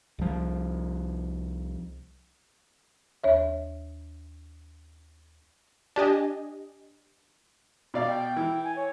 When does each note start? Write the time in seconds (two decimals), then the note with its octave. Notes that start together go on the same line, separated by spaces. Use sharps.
0.19 C2 F3
3.24 D#2 C#5 E5
5.96 D4 G4 D#5 G#5
7.94 B2 D5 F5
8.07 G5
8.37 E3
8.64 G#5
8.76 C#5